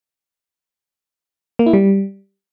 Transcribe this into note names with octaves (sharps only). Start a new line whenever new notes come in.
A#3
E4
G3